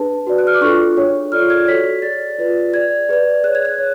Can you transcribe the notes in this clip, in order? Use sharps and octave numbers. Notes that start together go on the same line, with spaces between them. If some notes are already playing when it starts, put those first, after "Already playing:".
Already playing: D4 G#4 B4 A5
F#4 B4 D5
F#6
F6
D6
D4 F4 A4 C#6
D4 G#4 C#5
F4 A4 D5 F6
G#6
F#4 A4 C#5 B6
G#4 D5 A6
F4 B4 D5
G#4 D5 G#6
G#4 B4 D5
G#4 C#5 F#6
G#6
F#6
C#5